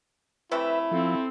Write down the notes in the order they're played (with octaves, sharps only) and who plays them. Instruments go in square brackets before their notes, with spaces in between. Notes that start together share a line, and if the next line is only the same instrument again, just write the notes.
[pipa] C3 E3 A3 [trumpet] E4 [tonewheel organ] B4 E5
[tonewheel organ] F3 [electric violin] C4 A4